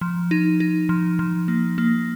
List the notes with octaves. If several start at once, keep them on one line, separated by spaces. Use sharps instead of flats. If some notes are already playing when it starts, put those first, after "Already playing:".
F3
D#4
D#4
F3
F3
A#3
A#3